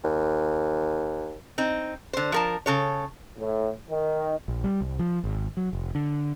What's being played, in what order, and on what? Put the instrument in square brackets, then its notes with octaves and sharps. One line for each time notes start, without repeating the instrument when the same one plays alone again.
[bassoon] D#2
[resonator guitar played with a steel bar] C4 D#4
D3 C5
F3 A#4 A5
C#3 A4 C#5
[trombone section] A2
D#3
[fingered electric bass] A#1
G3
C2
F3
G#1
F#3
F1
D3